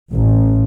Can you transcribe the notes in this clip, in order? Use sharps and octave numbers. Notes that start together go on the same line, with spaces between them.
A1